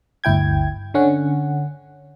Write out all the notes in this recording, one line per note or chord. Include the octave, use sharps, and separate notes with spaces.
G1 D2 E4 G5 G#6
D3 C#4 F#5